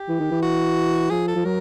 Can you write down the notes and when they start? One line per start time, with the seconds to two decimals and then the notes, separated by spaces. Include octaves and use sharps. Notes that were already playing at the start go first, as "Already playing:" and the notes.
Already playing: G4
0.09 E3
0.20 D#3
0.31 E3
0.43 F#4
1.10 F3 G#4
1.28 A4
1.36 F3
1.45 F#3 A#4